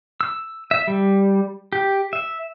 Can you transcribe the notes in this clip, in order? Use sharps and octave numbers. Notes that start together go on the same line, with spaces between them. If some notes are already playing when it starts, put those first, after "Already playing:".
E6
E5
G3
G4
E5